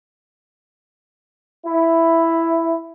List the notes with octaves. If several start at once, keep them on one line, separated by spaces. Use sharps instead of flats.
E4